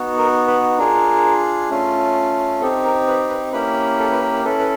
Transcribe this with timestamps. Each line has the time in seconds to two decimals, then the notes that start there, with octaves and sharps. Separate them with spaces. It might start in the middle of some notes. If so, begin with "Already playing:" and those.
Already playing: B3 D#4 F#4
0.17 A#4
0.47 B4
0.78 D4 F4 G#4 A#4
1.70 A3 C#4 F4
2.61 C4 D#4 G4 A4
2.84 A#4
3.07 B4
3.30 B4
3.53 A#3 C#4 E4 G4 B4
3.99 A4
4.12 B4
4.22 A#4
4.44 C#4 E4 A4 B4
4.59 B4